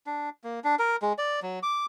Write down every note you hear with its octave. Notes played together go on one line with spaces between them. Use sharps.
D4
A#3
D4
A#4
G#3
D5
F#3
D6